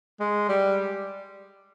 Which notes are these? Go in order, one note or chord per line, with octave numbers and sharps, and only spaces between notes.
G#3
G3